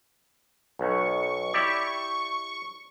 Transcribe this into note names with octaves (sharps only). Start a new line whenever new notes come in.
B1 C#6
E4 G4 D5